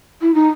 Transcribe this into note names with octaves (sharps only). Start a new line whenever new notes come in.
E4
D#4